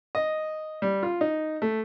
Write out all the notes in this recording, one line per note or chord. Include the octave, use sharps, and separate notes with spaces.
D#5
G3
F4
D#4
A3